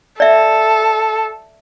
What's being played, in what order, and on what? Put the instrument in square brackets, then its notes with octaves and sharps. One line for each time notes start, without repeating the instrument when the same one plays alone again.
[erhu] A4 [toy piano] D5 E5